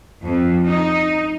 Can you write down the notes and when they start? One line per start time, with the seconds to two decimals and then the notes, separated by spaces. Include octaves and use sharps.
0.25 F2
0.66 D#4